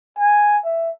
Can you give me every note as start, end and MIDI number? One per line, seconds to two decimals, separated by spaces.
0.18 0.57 80
0.65 0.90 76